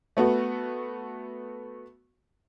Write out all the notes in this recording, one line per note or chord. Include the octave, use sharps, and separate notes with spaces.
A3 B3 F#4